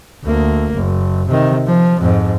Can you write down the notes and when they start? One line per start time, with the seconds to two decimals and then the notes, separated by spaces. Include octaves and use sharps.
0.24 D2 A#3
0.74 F#1
1.28 C3 D#3
1.66 F3
2.00 F2 G#2